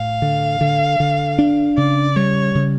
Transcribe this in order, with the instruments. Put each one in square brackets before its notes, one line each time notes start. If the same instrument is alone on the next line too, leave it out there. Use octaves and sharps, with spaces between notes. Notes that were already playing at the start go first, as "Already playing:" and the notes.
Already playing: [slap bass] A2 [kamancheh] F5
[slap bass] D3
D3
D3
D4
[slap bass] C#3 [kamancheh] D5
[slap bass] G3 [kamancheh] C#5
[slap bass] C#3